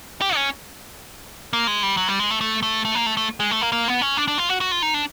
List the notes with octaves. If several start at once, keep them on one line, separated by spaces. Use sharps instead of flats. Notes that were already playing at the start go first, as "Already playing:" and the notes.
G4
C#4
A#3
G#3
G3
F#3
G3
G#3
A3
A3
A3
A3
A#3
A3
A3
G#3
A3
A#3
A#3
B3
C#4
D4
D4
F4
F#4
F#4
F4
D#4
D4